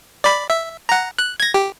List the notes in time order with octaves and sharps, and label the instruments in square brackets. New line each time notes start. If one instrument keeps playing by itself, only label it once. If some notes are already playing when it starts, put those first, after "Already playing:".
[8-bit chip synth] D5 B5
E5
F#5 A#5
F#6
G#6 A#6
G4